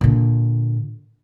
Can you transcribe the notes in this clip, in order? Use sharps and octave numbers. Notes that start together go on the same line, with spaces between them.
A#2 D3